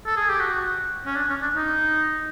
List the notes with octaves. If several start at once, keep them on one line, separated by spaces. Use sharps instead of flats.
A4
G#4
G4
F#4
C#4
D4
C#4
D4
D#4